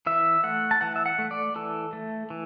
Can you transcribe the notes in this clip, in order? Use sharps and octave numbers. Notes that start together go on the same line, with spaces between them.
E3 E5
A3 F#5
A5
E3 F#5
E5
F#5
A3
D5
E3 A4
A3
E3